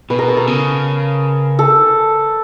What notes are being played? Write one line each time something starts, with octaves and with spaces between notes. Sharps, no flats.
B2 B4
A#4
A4
A#4
C#3
A4